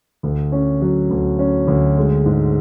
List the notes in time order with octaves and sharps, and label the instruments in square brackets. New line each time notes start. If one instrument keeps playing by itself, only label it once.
[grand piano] D2
C#4
F#3
D2
C#4
D2
G#3
G#2